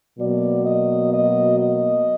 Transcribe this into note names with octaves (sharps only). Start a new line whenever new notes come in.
B2 F#3 A#3 D5
D#5
D#5
D#5